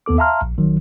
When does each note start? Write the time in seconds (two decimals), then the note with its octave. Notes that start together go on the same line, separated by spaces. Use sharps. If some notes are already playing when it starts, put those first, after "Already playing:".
0.06 D#2 B3 A4 D6
0.18 E5 F5 A5 A#5 C6 F6
0.42 A#1
0.58 G#1 D#3 F#3